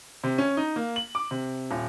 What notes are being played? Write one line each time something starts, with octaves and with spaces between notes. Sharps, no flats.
C3
C#4
D#4
A#3
F#7
D6
C3
D#1